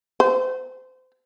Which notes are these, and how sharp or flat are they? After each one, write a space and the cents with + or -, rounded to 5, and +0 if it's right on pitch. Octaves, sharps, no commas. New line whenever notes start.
C5 -30